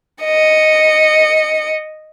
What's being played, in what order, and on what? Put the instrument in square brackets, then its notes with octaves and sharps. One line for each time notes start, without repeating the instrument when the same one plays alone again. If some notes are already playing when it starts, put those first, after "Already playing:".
[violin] D#5 C#7